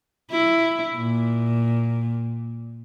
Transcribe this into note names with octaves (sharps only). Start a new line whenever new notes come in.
E4
A#2